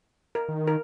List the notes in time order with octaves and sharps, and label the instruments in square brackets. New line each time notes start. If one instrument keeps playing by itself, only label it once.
[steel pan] A#4
[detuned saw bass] D#3
[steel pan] A#4